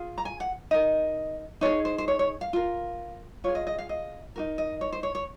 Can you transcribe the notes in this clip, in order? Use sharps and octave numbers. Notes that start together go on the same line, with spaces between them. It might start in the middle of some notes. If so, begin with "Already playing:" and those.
Already playing: F4 G#4
A#5
G#5
F#5
D#4 A#4 D#5
D#4 G#4 C#5
C5
C5
C#5
C#5
F5
F4 A#4
F4 C#5
G#4
D#5
D#5
F5
D#5
D#4 F#4 A#4
D#5
C#5
C5
C#5
C#5